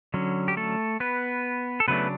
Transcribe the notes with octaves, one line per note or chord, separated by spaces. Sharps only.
D3 F#3 C#4
G4
A3 A4
B3 B4
A4
C#3 F#3 A3 B3 D4 B4